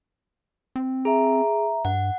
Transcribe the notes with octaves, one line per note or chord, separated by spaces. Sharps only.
C4
G#4 E5 A#5
G2 F#5